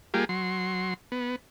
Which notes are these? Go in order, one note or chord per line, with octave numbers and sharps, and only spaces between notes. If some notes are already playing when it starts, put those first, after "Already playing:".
G3 A#3 F4 G4 G#4
F#3 C6
B3